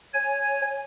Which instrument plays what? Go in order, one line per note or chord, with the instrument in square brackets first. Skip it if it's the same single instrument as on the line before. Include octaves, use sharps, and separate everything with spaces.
[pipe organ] C#5 G#5